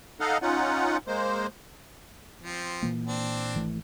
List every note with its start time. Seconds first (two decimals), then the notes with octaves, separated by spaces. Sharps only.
0.20 D#4 A4 D#5 F5 F#5
0.42 C#4 D#4 F4 F#5
1.07 G#3 A#3 C5
2.39 F3 C4
2.82 A#2 E3 A#3
3.07 C4 D4
3.54 G#1 E3 A3